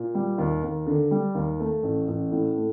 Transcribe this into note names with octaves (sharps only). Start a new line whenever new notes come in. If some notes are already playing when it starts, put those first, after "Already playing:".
Already playing: A#2
G3
D#2
D#2
D3
G3
D#2
A3
A1
A1
A2
A3